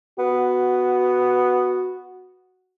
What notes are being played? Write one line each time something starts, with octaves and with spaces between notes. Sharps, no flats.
B3 F#4